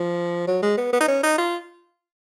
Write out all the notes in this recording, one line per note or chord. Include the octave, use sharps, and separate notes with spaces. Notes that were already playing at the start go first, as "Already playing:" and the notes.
Already playing: F3
F#3
G#3
B3
B3
D#4
C#4
D#4
F4